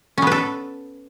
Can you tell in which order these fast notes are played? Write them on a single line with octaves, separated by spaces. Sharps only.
C#4 B3 B4 A4